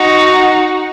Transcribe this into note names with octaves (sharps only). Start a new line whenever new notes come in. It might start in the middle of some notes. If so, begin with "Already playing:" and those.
Already playing: D#4 F#4